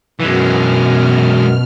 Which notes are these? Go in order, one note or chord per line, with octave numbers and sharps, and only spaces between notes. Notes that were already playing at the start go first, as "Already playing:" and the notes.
F#2 B2 E3 G#3 F6